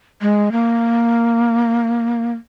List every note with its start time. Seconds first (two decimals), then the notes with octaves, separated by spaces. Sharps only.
0.22 G#3
0.52 A#3